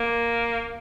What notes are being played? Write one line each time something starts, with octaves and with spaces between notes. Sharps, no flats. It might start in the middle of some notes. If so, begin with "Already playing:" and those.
Already playing: A#3